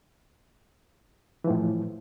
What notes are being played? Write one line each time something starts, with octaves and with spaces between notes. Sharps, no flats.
A2 E3 F3